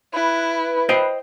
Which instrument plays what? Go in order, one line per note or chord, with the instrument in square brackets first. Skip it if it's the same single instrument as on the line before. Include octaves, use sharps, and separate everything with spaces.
[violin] E4 [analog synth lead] B4
[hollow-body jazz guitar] C5 D#5 G5